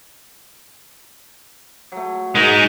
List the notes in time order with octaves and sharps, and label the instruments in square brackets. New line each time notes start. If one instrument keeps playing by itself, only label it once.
[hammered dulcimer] F#3 A3
[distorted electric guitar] G#3 D#4 [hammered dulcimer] F#4 G#4 A#4